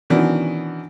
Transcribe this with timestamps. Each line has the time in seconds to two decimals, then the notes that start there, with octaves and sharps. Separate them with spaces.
0.10 B2 D#3 E3 F#3 C#4 D4